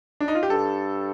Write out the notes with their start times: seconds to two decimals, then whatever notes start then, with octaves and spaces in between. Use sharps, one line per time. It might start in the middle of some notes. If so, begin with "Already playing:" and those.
0.20 D4
0.28 D#4
0.35 F4
0.43 G4
0.50 G2 A4